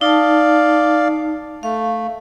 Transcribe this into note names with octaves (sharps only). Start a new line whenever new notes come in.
D#4 D5 F5 A5
A3 F5